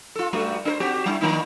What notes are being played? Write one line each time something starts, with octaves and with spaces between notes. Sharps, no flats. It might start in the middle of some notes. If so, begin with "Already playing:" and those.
F4 A4
G2 A3 F#4
D4 A#4 C5
C4 F#4 G4
G3 D4 E4
D#3 A#3 D#4